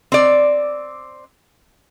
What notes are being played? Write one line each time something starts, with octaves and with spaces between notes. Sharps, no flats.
C4 D5